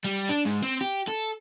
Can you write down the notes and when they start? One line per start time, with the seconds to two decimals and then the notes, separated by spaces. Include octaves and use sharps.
0.04 G3
0.29 D4
0.45 G#2
0.63 C4
0.81 G4
1.08 A4